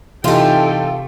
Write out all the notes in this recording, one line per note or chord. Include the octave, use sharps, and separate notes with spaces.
C3 E3 A3 D#4 F4 G4 A4 G5